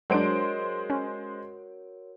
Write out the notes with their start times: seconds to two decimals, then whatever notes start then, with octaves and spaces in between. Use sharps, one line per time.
0.10 F#3 G#3 D4 F#4 A#4 C5 C#5 D7
0.90 C#4